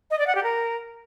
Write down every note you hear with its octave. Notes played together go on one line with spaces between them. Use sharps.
D#5
D5
F#5
G4
A#4